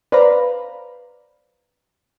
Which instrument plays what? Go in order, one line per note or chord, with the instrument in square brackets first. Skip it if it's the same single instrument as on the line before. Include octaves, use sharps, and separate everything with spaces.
[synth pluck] B4 C5 D5 F5 A#5 B5